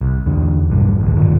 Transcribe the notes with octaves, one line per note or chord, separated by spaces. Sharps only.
C2
E2 D3
B1 G2
A1 D2
G1 D#2 A#2